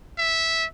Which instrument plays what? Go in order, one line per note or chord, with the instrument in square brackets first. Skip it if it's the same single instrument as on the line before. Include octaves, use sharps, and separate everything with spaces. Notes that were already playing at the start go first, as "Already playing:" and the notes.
[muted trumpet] E5